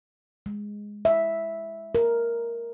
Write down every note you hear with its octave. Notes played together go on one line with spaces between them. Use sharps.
G#3
E5
A#4